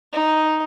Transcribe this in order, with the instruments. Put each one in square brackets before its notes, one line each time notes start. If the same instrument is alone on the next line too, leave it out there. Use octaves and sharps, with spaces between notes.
[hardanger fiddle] D#4